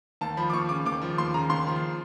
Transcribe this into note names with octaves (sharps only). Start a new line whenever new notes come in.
D#2 A5
F3 B5
D6
D#2 C#6
C#3 D6
D#2 D6
F3
D#2 C6
C#3 A#5
D#2 C6
F3